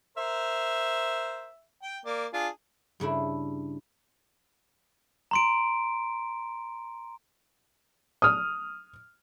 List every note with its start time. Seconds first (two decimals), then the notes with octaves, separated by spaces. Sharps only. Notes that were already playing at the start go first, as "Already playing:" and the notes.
0.17 A#4 C5 E5
1.82 G5
2.06 A#3 D5
2.34 D4 F4 G#4
3.00 G2 C#3 D4 E4
5.31 A#5 C6 D7
8.22 D#6 F6